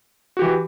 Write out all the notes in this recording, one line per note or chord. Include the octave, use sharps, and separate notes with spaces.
E3 F#4 G4